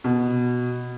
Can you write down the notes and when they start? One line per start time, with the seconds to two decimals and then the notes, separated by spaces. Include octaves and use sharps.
0.04 B2